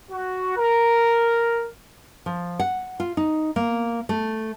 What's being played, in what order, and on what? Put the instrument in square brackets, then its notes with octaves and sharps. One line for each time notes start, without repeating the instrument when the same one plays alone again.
[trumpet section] F#4
A#4
[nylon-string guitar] F3
F#5
F4
D#4
A#3
A3